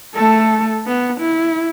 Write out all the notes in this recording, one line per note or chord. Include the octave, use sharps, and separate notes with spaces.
A3 A4
B3
E4